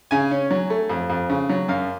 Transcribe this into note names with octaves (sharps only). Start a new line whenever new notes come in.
C#3 G#5
C#4
F#3
A3
F2
F2
C#3
F#3
F#2 F5